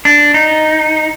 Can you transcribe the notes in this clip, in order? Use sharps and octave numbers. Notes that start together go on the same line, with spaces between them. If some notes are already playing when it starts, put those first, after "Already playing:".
D4
D#4